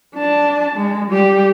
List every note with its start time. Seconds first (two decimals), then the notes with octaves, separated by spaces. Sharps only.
0.15 D4 A5
0.76 G#3
1.11 G3 G4